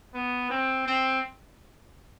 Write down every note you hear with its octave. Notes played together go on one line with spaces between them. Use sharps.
B3
C4
C4